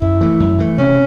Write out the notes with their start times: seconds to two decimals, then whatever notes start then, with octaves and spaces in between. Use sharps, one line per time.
0.02 F#2 E4
0.21 E3 A3
0.40 F#2
0.59 E3 A3
0.78 C3 C#4